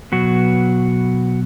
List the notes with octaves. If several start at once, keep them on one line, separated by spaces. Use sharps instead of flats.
B2 F#3 B3 F#4